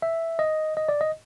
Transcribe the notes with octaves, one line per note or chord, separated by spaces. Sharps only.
E5
D#5
D#5
D5
D#5